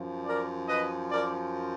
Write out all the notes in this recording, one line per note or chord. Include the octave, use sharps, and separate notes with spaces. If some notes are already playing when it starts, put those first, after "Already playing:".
Already playing: F#2 F3
A#4 D5
B4 D#5
A#4 D5